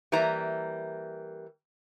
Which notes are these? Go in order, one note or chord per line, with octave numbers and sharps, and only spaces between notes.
E3 G3 A#3 A#4 E5 A#5